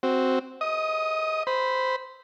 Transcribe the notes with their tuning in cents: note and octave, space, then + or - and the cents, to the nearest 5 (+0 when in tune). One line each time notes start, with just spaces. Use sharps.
C4 +0 F#4 +0
D#5 +25 D#6 +0
C5 -10 B5 +0